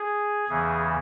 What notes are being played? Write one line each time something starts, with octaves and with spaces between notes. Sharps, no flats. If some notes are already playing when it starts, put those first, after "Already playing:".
Already playing: G#4
E2 C#3 E3 G#4